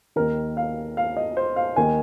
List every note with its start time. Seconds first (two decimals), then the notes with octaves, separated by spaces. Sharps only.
0.16 D#2 D#3 A#4
0.57 F5
0.97 F5
1.17 D#5
1.37 C5
1.56 F5
1.76 D#2 D#3 G#5